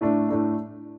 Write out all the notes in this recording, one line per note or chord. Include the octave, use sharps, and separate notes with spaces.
A2 A3 D4
A2 A3 D4